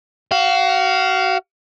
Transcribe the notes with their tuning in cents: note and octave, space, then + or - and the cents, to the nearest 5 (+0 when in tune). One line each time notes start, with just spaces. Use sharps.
F#4 +30 F5 +0